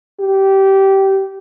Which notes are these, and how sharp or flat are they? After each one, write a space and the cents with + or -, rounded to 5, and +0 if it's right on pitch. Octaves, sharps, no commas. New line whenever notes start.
G4 -20